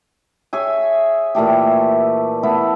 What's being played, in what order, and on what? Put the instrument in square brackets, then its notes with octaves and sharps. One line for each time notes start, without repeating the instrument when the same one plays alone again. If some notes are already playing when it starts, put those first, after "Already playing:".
[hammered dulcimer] G#4 C#5 E5 G#5
A#2 E3 A3 G4
A3 B3 E4